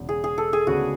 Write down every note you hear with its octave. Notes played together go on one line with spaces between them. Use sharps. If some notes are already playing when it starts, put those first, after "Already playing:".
Already playing: E1 E2 C#3
G#4
G#4
A4
G#4
D2 C#3 G#3 B3 D4 F#4